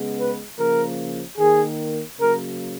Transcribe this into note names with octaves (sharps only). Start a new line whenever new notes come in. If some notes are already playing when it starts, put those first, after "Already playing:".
Already playing: C#3 G#3 B3
B4
C#3 F3 A#3 A#4
D#3 A#3 G#4
C#3 F#3 A#3 A#4